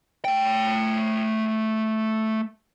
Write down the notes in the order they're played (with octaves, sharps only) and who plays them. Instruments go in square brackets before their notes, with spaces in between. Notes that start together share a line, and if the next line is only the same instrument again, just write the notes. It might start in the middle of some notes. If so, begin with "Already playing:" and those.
[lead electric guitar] A3 G5